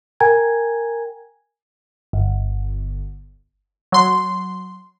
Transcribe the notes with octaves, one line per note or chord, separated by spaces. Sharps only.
A#4 G5 G#5 A#5 G#6
G1
F#3 C6